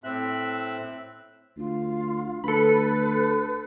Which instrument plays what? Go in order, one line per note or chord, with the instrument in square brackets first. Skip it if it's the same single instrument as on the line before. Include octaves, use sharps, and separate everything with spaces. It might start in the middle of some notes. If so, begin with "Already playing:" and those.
[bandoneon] A2 C4 E5 F#6
[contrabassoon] D2 [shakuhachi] F4
[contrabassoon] D2 [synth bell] A4 B5 [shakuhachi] B4